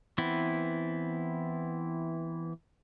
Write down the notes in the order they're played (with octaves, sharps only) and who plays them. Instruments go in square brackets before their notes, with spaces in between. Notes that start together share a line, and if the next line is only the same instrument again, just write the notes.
[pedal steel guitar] E3 B3 C4 E4